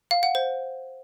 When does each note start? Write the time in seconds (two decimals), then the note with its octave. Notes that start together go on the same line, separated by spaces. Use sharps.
0.11 F5
0.23 F#5
0.35 C5